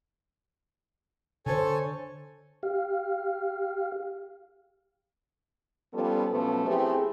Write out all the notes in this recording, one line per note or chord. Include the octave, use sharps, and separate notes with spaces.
D3 A4 C5 C#5 G#5
G4 F5
F3 G3 B3 C#4 F4 A4
B2 F3 F#3 A3 B3 C#4
A3 C4 E4 G4 G#4